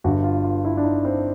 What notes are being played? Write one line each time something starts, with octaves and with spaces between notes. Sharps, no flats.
G1 G2 D3 F#4
F4
F4
E4
D4
D#4
C4